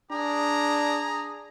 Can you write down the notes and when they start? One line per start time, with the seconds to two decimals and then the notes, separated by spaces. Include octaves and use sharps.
0.11 D4 G#4 A#5